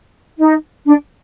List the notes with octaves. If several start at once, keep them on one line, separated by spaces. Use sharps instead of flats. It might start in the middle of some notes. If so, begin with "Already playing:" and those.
D#4
D4